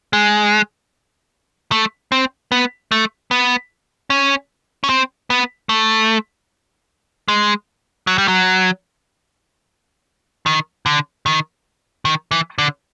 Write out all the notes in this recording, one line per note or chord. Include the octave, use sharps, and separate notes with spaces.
G#3
A3
C4
B3
A3
B3
C#4
C#4
C4
B3
A3
G#3
F#3
G3
F#3
D#3
D3
D#3
D#3
E3
D3